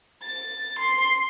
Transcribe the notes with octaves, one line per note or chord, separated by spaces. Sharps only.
A6
C6